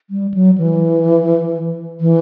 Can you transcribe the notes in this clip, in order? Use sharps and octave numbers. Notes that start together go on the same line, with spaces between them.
G3
F#3
E3
E3